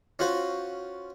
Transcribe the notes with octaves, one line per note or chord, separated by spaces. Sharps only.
C#4 F4 F#4 C5